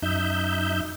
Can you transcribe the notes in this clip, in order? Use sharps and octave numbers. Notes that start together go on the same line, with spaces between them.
F#2 D#4 E5 G6